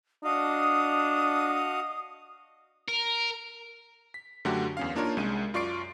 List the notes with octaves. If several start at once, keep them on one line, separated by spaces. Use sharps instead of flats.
D4 F#4 D#5 F5 D#6
A#4
B6
F#2 D3 F#3 A3 F#4 G4
E2 C#4 F5
A#3 D4 D#4 F4 A#4 C#5
C2 G#3 C#4 D#7
F#2 F4 D5 C#6 C7 D7